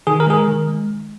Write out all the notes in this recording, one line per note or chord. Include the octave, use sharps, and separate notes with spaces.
D#3 G#4
A#4
G#3 G#4
A#4
D#3
G#3